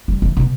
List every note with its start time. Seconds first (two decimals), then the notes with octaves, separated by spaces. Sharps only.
0.08 G3
0.22 E3
0.37 B2